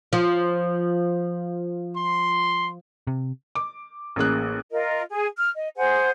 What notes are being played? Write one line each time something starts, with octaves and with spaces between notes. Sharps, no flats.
F3
C6
C3
D6
A1 A#3 G#4 F#6
F4 A#4 D#5
G#4
F6
D#5
G#4 C5 F#5 G#5